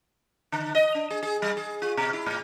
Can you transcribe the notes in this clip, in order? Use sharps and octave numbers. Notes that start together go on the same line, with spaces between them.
D3
D#5
D4
G#4
G#4
G3
G#4
F4
B2
E4
A2